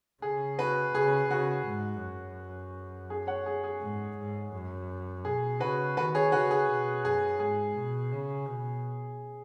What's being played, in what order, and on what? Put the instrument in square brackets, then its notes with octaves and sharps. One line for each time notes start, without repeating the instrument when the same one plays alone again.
[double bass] C#3 [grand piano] G#4
[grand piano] F#4 B4
[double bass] C#3 [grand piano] G#4
[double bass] C#3 [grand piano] F#4
[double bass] G#2
F#2
[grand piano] G#4
C#5 F#5
G#4
G#4
[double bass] G#2
G#2
F#2
[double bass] B2 [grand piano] G#4
[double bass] C#3 [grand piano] F#4 B4
[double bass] D#3 [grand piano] F#4 B4
[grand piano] G#4 C#5
[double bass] C#3 [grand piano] F#4 B4
[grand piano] G#4
[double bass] B2
[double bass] F#2 [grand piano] G#4
[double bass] G#2 [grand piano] G#4
[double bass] B2
C#3
B2